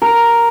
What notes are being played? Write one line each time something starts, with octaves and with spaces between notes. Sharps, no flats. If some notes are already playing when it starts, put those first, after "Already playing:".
A#4